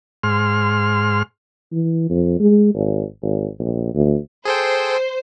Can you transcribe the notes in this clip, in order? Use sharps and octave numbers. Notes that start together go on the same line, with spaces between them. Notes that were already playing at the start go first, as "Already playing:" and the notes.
G#2 C6 F6
E3
F2
G#3
G#1
G#1
A#1
D2
G#4 A4 C5 G5